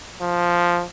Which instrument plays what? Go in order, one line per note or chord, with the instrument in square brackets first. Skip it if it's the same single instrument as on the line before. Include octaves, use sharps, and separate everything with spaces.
[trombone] F3